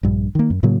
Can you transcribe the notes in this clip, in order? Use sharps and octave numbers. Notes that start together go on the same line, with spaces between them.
A#1 G2
D#3 A#3
F#2
A2 C#3 F#3 A#3